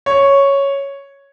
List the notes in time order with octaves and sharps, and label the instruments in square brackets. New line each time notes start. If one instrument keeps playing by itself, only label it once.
[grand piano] C#5